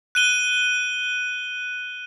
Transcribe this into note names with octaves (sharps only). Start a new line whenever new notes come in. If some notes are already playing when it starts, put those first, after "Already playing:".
F#6 D#7 G7